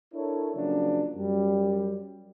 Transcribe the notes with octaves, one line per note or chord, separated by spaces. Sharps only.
D4 E4 A4 A#4 C#5
C#3 F3 F#3 A#3 C#4 D4
F#2 G3